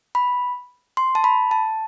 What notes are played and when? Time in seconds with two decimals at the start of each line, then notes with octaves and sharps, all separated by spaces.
0.15 B5
0.97 C6
1.15 A5
1.24 B5
1.51 A5